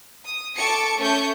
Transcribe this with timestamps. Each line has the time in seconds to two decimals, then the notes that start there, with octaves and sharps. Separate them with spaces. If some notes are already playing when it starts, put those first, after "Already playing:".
0.25 D#6
0.57 A4 A5 C#6 D6 C#7
0.98 A3 C#4 C#6 G6